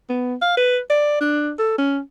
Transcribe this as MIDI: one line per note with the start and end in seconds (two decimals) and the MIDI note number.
0.09 0.35 59
0.42 0.53 77
0.57 0.79 71
0.90 1.20 74
1.21 1.52 62
1.59 1.76 69
1.78 2.00 61